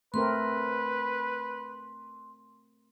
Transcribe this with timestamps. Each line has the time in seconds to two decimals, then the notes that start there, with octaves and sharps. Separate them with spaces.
0.14 A3 C4 A#4 B4 C6